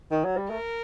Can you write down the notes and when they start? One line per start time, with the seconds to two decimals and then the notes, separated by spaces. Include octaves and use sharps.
0.11 D#3
0.25 F#3
0.37 G3
0.50 A3 A#4